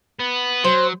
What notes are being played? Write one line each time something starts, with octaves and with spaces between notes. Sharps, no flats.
B3
F#3 C5